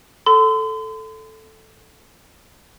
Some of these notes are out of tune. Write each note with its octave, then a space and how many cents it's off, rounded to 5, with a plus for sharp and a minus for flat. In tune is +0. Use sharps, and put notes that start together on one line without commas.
A4 +0 C6 -40